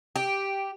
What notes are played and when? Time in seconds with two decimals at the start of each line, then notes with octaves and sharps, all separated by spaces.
0.16 G4